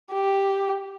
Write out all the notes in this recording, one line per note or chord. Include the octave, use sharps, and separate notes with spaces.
G4